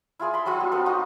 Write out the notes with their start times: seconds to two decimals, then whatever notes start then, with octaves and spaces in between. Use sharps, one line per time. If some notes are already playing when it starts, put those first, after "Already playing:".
0.19 E4 F4 G#4 D5
0.34 B5 C6
0.46 F#3 G3 D4 F4
0.60 B3
0.72 C4 A4 B4
0.86 D#4 F4 F#4 A#5